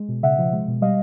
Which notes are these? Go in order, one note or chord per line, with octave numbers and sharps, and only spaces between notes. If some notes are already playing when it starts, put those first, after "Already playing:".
Already playing: G#3
B2
C#3 E5 F#5
F3
G#3
B2
G3 D#5 F5